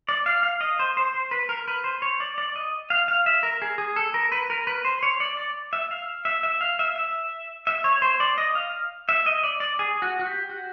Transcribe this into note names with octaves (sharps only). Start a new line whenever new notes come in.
D5
F5
F5
D#5
C5
C5
C5
B4
A#4
B4
C5
C#5
D5
D5
D#5
F5
F5
E5
A#4
G#4
G#4
A4
A#4
B4
A#4
B4
C5
C#5
D5
D5
E5
F5
E5
E5
F5
E5
E5
E5
C#5
C5
D5
D#5
F5
E5
D#5
D5
D5
G#4
F#4
F#4
G4
F#4